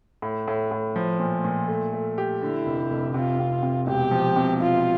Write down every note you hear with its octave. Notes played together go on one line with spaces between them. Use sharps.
A2
A2
A2
F3
A#2
A#2
A3
A3
G4
D3 E4
F1
F1
C3 F4
C3
C3
E1 G4
F3
C3
E1 F4